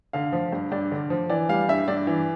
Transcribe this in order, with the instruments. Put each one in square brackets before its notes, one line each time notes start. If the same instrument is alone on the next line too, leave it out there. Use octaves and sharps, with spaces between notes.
[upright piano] D3 F5
F3
G2
G2 D5
D3
F3
E3 D5
G3 F5
G2 E5
G2 D5
E3